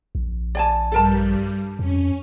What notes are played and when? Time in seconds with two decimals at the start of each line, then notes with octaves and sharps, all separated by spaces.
0.15 A#1
0.55 D5 G#5 A5
0.92 G2 G3 A4 A#4 A5
1.79 F2 C#4